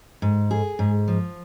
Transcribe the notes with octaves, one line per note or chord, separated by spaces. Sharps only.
G#2
G#4
G#2
F3